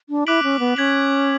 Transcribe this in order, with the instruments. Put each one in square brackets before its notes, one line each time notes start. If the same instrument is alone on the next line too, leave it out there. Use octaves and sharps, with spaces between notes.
[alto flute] D4
[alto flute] E4 [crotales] D6 F#6 B6 D7 F#7
[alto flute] C#4
B3
[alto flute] C#4 [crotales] G#6 B6 F#7